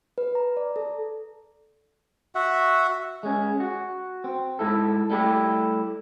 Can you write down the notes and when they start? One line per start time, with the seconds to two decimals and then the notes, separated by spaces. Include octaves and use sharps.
0.18 B4
0.35 A#5
0.57 D5
0.76 A4
2.35 F#4 E5 F#5
3.23 G#3 C#4
3.60 F#4
4.24 C4
4.59 G#2 E4 A4
5.10 G3 A3 E4 G4